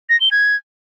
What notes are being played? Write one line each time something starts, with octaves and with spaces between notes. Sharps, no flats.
A#6
G7
G#6